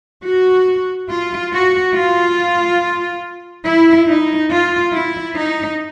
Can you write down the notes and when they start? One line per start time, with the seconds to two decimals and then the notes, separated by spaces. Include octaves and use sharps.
0.24 F#4
1.09 F4
1.52 F#4
1.94 F4
3.66 E4
4.08 D#4
4.51 F4
4.93 E4
5.37 D#4